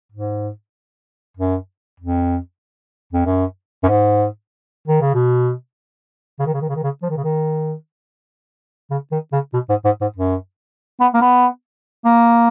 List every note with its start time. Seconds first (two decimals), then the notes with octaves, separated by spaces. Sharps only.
0.12 G#2
1.37 F#2
2.00 F2
3.13 F2
3.26 F#2
3.83 F#2
3.88 G#2
4.88 D#3
5.01 C#3
5.14 B2
6.39 C#3
6.46 D#3
6.54 C#3
6.61 D#3
6.69 C#3
6.76 D#3
6.83 C#3
7.02 F3
7.10 D#3
7.17 C#3
7.24 D#3
8.91 C#3
9.12 D#3
9.32 C#3
9.54 B2
9.69 G#2
9.85 G#2
10.01 G#2
10.16 F#2
11.00 B3
11.14 A#3
11.21 B3
12.05 A#3